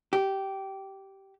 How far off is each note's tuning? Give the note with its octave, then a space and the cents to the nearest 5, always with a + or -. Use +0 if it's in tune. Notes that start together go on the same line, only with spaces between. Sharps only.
G4 -15